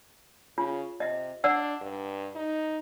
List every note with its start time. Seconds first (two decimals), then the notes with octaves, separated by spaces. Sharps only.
0.58 C#3 F4
1.00 C3 D#5 E5
1.44 D4 D5 F#5 E6
1.82 G2
2.36 D#4